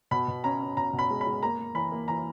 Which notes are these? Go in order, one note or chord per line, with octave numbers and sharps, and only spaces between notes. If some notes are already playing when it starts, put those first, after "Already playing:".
B2 B5
B2
C#4 A#5
C#4
B2 A#5
B2
B5
G#3
B5
G#3
A#3 A#5
A#3
E3 B5
A#3
E3 A#5